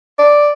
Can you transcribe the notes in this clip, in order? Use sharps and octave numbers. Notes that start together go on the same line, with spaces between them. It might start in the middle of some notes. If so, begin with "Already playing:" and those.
D5